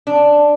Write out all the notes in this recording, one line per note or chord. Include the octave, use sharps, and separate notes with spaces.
D4